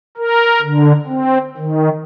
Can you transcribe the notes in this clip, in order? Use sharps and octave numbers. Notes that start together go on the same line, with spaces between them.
A#4
D3
C4
D#3